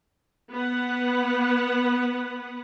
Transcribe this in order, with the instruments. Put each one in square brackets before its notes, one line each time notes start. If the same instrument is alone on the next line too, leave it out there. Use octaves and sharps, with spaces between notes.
[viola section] B3 B4 F#5